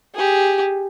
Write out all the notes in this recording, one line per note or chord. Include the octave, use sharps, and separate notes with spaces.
G4 G#4